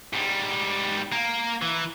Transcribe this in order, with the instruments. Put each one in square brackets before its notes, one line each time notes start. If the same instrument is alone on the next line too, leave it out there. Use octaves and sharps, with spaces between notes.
[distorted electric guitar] G#2 G3
A#3
E3